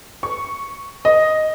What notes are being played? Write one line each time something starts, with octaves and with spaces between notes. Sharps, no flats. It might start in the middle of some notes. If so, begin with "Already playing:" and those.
C#6
D#5